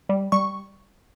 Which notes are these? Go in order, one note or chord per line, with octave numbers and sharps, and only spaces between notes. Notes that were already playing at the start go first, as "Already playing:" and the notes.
G3
G3 C#6